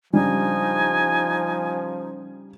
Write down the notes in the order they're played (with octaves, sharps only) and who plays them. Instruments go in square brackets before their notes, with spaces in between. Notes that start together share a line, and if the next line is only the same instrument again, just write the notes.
[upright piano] C#3 G3 D4 [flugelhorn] F3 [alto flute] D#4 [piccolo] G#5